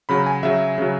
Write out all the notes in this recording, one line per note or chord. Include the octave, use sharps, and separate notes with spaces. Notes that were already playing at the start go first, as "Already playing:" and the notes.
C#3 F#3 B5
G#5
C#3 F#3 E5
C#3 F#3